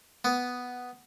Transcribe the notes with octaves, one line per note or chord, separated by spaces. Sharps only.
B3